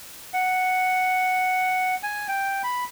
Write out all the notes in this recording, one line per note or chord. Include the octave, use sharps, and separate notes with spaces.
F#5
G#5
G5
B5